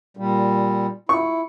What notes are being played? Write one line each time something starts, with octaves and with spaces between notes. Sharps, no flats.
A#2 G3
E4 C#6